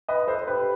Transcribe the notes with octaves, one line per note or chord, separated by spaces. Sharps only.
B4 D#5
A4 C5
G4 B4